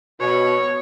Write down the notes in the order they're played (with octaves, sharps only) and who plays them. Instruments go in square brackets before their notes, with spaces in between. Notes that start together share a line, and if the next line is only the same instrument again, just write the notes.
[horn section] B2 [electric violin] C#5